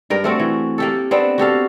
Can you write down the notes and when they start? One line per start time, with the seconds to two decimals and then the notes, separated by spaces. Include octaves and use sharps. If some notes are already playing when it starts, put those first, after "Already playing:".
0.10 G2 A#4 G5
0.24 A3 C4 F#4
0.40 E3
0.78 A#3 G4 A4
1.11 B3 C4 D4
1.38 F#4 G4 A4 F5